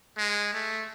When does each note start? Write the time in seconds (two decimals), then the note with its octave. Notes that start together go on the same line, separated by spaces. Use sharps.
0.17 G#3
0.53 A3